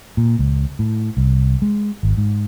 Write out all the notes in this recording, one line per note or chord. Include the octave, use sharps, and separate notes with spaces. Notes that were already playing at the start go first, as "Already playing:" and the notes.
A#2
C#2
A2
C2
G#3
G#1
G#2